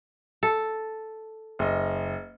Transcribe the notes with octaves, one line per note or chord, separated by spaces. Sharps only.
A4
F#1 D#5